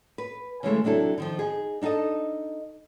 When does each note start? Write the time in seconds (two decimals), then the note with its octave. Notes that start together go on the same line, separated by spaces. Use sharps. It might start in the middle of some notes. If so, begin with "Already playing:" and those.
0.18 B4
0.63 C#3 E3 G#3 A3
0.84 C3 F#3 D4 E4 A4
1.18 D3 D#3 F3
1.39 D#4 G#4
1.81 D4 D#4 F4 A4 D#5